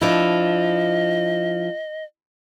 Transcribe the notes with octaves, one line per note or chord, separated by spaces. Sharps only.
F3 D4 E4 D#5